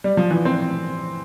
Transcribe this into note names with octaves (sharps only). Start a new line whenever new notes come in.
G3
F3
E3
C4